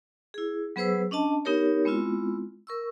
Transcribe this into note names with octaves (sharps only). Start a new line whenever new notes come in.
E4 G#4
F#3 B3 G#4 B4 C5 E6
C#4 D4 D#5 A5
B3 D#4 G4 A#4 C#5
G#3 B3 C4 E4 F4
A#4 C#6 E6